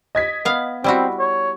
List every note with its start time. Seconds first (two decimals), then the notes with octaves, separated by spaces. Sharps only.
0.15 D#5 G#6 B6
0.45 B3 F5
0.84 G3 C4 E4 F#4
1.19 C#5